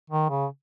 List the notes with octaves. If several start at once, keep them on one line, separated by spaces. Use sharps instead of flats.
D#3
C#3